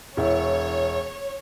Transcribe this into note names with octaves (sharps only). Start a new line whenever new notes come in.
E1 E4 C#5